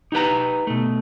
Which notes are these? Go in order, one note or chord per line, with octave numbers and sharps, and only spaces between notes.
D#4 G4 B4 A#5
B2 A3